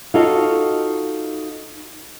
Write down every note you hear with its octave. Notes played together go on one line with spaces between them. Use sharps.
D#4 F4 F#4 A4 C#5 F5